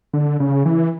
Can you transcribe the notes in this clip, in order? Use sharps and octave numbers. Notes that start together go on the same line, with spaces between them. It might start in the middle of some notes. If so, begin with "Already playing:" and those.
D3
C#3
E3